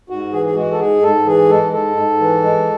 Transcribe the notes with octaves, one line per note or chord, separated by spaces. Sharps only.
G#2 F#4
E3 G#4
G#4
G#3 F#4
A4
G#2 G#4
G#2 A4
E3 G#4
G#3 A4
G#2 A4
G#2
E3
G#3